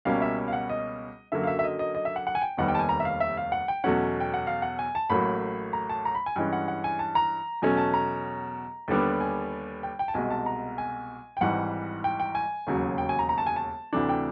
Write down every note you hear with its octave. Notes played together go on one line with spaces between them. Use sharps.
C#2 B2 G3 A#3 C#4 F5
E5
F5
F#5
D#5
F#2 D3 F#3 A#3 E5
F5
E5
E5
D#5
D#5
D#5
E5
F#5
F#5
G#5
G5
F1 D#2 D#3 G3 B3 F#5
G5
A5
G#5
A#5
E5
F5
E5
F5
F#5
G5
E2 B2 F#3 A3 C#4 F#5
G5
F#5
F5
F#5
G#5
A5
A1 A2 F#3 A#3 B5
A#5
A5
A#5
B5
G#5
G2 E3 G#3 C#4 G5
F#5
F#5
G#5
A5
A#5
E2 B2 F#3 A3 C#4 G#5
A5
A#5
D#2 D3 G3 B3 D4
G#5
G5
G5
A5
C2 B2 G#3 G#5
A5
A#5
G#5
G5
G#1 G#2 E3 G3 F#5
G5
G5
G#5
E1 D#2 C#3 F#3
G5
G#5
A#5
A#5
A5
G#5
A5
D2 C3 E3 A3 D4
G5